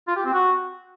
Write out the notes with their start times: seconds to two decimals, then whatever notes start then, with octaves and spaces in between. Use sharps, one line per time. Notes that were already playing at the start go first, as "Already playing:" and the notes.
0.08 F4
0.16 G4
0.25 C4
0.33 F#4